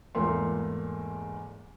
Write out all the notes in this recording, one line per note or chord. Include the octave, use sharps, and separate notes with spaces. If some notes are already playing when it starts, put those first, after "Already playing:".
E2 G#2 A3 A#3 F4 C6